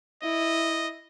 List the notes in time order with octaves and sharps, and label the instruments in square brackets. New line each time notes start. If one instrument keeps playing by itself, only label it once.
[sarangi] E4 [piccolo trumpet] D#5